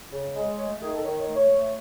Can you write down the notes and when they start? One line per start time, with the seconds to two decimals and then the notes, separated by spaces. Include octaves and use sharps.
0.12 C#3
0.35 G#3
0.58 A3 C#5
0.81 D#3 G#4
0.93 A4
1.04 D#3 C#5
1.20 C#5
1.27 A3
1.35 C#5
1.51 A3